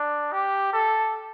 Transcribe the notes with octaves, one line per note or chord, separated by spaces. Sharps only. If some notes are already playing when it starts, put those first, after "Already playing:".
Already playing: D4
G4
A4